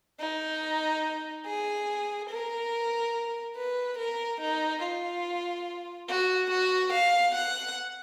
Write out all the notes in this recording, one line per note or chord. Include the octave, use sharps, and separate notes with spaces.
D#4
G#4
A#4
B4
A#4
D#4
F4
F#4
F#4
F5
F#5